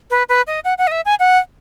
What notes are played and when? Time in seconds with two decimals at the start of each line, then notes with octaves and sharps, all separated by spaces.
0.10 B4
0.29 B4
0.47 D#5
0.64 F#5
0.78 F#5
0.87 D#5
0.91 E5
1.05 G#5
1.19 F#5